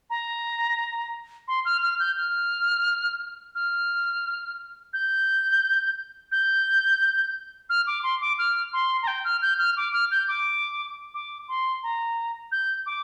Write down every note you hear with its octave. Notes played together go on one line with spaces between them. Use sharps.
A#5
C6
F6
F6
G6
F6
F6
G6
G6
F6
D6
C6
D6
F6
C6
A#5
G5
F6
G6
F6
D6
F6
G6
D6
D6
C6
A#5
G6
D6